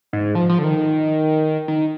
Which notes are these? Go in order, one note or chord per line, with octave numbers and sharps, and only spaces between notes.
G#2
F3
F3
D3
D#3
D#3